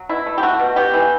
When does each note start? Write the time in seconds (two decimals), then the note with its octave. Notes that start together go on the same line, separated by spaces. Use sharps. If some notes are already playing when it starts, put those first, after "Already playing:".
Already playing: F#3
0.09 B2 E4
0.26 A3
0.38 G4
0.43 A3 F#4
0.60 B2
0.76 B3 G4
0.94 E3